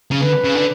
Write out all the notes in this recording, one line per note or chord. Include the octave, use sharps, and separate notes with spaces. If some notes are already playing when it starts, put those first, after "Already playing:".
C#3
D3 B4
C#3
D3